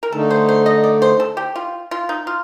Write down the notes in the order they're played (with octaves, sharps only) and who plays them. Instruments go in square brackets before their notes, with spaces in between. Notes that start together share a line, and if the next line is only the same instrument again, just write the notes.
[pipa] A#4
[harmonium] D3 A3 D#4 [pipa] A4
[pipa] C5
C5
D#5
D5
C5
A4
G4
F4
F4
D#4
F4